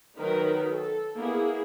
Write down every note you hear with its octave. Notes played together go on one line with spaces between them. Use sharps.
D#3 F#3 D#4 A#4 B4
A4
A#3 B3 E4 G#4